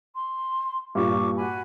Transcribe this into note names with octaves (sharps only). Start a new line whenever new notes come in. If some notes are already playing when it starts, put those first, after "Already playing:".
C6
G2 A#2 F4 C#6 D6
F#4 G#5 B5